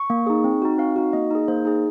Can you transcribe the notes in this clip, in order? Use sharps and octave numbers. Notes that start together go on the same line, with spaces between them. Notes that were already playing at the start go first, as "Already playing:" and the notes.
Already playing: C#6
A#3
D#4 G#4
C4
D#4 F#4
C4 F5
D#4 F#4
A#3 D#5
D#4 G#4
A#3 C5
D#4 G#4